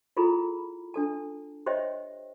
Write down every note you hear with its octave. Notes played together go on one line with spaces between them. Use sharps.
E4 F4 G#4 A4 A#5 B5
D4 A4 A5
G4 C5 C#5 D#5 E5 G5